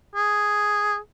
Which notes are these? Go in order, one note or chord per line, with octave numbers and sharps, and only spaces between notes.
G#4